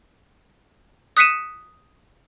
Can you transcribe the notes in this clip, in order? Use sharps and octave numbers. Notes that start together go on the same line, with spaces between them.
D#6 F#6 B6 C#7 D#7 E7